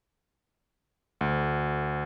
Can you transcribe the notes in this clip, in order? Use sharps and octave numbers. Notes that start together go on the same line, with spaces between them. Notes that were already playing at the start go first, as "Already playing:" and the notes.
D2